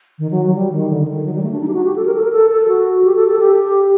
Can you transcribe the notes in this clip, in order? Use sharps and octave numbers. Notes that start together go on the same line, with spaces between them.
D#3
F#3
F#3
G3
D#3
D3
D#3
F#3
G3
A3
D4
D#4
G4
F#4
G4
A4
A#4
A4
A#4
A4
A4
F#4
G4
A4
A4
G4